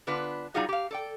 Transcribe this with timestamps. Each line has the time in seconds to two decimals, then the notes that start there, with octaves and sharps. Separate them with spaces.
0.07 D3 B3 D4 F4 B4
0.54 G3 D#4 F4 F#4 G#4 D#5
0.69 G4 F5
0.91 A4 D5 G5